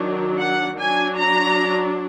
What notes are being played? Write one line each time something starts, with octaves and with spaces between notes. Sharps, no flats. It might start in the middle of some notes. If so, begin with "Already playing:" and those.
Already playing: D#3 F#3 D4
F#5
F#3 D4 G#5
A#5